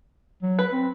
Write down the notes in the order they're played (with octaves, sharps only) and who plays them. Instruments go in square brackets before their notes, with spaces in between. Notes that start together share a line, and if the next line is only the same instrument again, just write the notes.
[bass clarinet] F#3
[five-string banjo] B4
[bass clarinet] C4